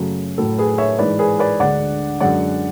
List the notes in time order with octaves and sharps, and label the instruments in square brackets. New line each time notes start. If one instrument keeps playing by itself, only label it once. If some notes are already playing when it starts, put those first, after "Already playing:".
Already playing: [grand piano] F#2 C#3 F#3 A3
A2 F#3 A3 A4
G#4 B4
C#5 E5
G#2 E3 G#3 B4 D5
G#4 B4
B4 D5
D2 D3 G#3 D5 F#5
F#2 D3 G#3 D5 F#5